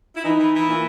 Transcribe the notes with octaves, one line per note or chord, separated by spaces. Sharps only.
E4
E3 D#4
E3
E3
A#2 E4